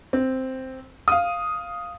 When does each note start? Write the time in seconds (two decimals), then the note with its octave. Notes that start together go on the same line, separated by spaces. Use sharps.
0.13 C4
1.08 F5 D#6